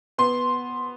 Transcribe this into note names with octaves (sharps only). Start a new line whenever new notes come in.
B3 C6